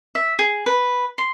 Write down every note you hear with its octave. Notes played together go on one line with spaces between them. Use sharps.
E5
G#4
B4
C6